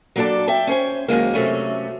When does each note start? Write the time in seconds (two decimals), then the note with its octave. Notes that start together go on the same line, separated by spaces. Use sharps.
0.16 F#3 A#3 D4 A4 D5 A5
0.48 E5 G5 A5
0.67 C#4 C5 G#5
1.08 F#2 D#3 G#3 A#3
1.34 C3 F#3 A3 C#4